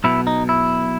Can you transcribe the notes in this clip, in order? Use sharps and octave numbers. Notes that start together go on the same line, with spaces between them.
B1 B2 E4
D#4
E4